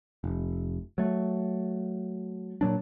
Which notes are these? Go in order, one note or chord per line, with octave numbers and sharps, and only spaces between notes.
F1
F#3 A3
A#2 F#3 D4